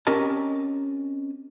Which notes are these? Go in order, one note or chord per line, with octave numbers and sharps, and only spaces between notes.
C4 C#4 G4 A#4 D#5 A5